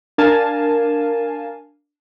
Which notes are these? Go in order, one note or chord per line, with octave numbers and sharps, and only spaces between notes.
D4 A#4 F5 G#5 A5